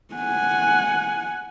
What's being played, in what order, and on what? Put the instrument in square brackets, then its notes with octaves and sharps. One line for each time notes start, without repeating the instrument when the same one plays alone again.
[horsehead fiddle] F#5 G#5